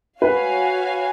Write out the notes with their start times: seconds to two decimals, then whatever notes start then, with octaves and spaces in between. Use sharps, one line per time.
0.21 F#4 B4 C#5 F5 G#5